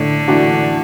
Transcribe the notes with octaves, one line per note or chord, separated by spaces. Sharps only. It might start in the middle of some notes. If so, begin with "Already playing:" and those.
Already playing: A2 D3
E3 A3 D4 F#4